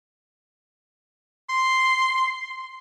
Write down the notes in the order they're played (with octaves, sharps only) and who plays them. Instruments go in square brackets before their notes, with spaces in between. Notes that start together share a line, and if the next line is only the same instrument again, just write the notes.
[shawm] C6